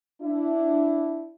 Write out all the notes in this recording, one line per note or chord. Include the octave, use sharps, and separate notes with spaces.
D4 E4